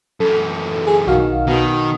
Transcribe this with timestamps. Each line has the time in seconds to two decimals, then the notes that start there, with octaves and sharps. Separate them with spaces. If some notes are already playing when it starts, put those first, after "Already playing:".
0.20 F#2 E3 A4
0.86 G#4
1.07 B1 D#3 F#4 F5
1.47 B2 D#3